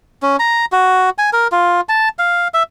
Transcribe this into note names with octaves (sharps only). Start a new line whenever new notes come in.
C#4
A#5
F#4
G#5
A#4
F4
A5
F5
E5